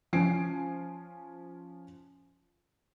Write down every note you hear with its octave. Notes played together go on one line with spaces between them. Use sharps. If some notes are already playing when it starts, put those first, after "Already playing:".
F3 C#4 G#5 C7 D7